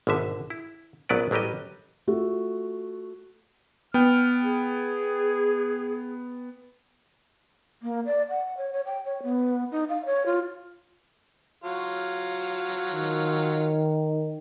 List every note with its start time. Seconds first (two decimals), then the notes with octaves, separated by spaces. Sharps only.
0.07 G#1 B2 D3 E5
0.50 E4
1.09 A#1 F#3 B3 B4 D5
1.31 A1 F#3 G3 G4 D#5
2.07 A3 F4 F#4 A4
3.94 B3 G5 F6
4.42 G#4
7.83 A#3
8.06 D5
8.29 F#5
8.57 C#5
8.73 C#5
8.86 G5
9.05 C#5
9.23 B3
9.72 D#4
9.89 F5
10.06 C#5
10.26 F4
11.64 F#3 F4
12.93 D#3